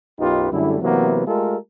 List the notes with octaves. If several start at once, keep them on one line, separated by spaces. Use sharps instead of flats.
B1 F#2 D#4 F4 G4 B4
F#2 D3 G3 A3 E4
C3 E3 F#3 A#3 B3
G#3 A3 F4 G4 A4 A#4